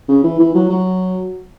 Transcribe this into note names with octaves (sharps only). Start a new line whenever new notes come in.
C#3
E3
E3
F#3
F#3